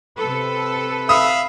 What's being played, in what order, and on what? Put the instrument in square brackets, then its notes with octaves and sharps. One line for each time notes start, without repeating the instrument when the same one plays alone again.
[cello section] C3 A4 [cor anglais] B4
[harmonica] E5 F5 B5 [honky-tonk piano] D#6